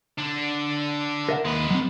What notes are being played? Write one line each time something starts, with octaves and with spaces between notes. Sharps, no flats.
D3 D4
A#4 E5 F#5
D#2 G#3 B4
F#3 C4